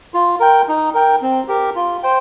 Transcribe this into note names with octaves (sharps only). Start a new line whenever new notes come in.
F4
A#4 G5
D#4
A#4 G5
C4
G4 A#4
F4
C5 G5